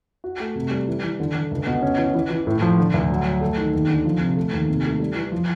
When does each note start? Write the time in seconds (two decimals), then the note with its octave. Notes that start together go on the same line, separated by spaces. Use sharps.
0.24 F#4
0.40 A3
0.56 C3
0.71 G3
0.88 E3
1.04 E3
1.20 D3
1.35 D3
1.51 C#2
1.67 B2
1.82 C#4
1.98 E3
2.15 E3
2.31 E3
2.47 A2
2.62 F3
2.78 D3
2.94 D2
3.10 F#3
3.25 F#3
3.41 A3
3.58 D#3
3.74 D#2
3.90 D3
4.05 F3
4.20 C3
4.36 A3
4.53 D#2
4.68 C3
4.85 A3
5.00 G3
5.16 E3
5.32 F3